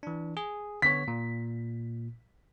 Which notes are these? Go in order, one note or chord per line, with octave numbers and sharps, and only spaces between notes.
E3 D4
G#4
D3 B3 C#5 B6
A#2